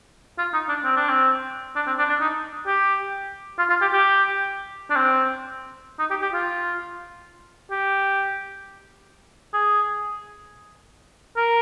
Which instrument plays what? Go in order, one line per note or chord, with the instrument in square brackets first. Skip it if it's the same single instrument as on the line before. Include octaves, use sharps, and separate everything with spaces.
[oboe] F4
D#4
D4
C4
D4
C4
D4
C4
D4
D4
D#4
G4
F4
F4
G4
G4
D4
C4
D#4
G4
G4
F4
G4
G#4
A#4